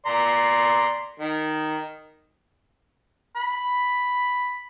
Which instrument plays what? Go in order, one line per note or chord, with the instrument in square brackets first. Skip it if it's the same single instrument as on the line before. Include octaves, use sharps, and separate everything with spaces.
[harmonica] D5 A#5 C6
D#3
[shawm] B5